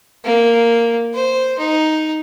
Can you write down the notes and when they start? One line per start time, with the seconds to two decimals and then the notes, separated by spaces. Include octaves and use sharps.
0.24 A#3
1.14 C5
1.59 D#4